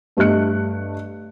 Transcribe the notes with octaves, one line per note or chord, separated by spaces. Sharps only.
G2 A3 G4 D#5 F#6 C#7